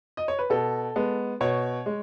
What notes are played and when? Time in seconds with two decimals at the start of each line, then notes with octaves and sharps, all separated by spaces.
0.17 D#5
0.28 C#5
0.39 B4
0.50 B2 A4
0.96 G#3 B3
1.41 B2 C#5
1.86 G#3